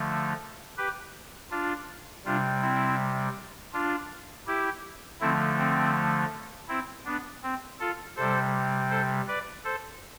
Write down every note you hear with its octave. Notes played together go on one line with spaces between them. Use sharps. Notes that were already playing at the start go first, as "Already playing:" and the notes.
Already playing: D3 F3 A3
G4 B4
D4 F4
C3 G3 D4 F4
C4 E4
D4 F4
E4 G4
D3 F3 A3 C4 E4
C4
C4 E4
B3 D4
C4
F4 A4
C3 G3 A4 C5
A4 C5
B4 D5
A4 C5